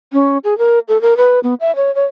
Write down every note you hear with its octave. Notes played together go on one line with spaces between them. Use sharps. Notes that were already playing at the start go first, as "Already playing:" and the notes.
C#4
G#4
A#4
A4
A#4
B4
B3
E5
C#5
C#5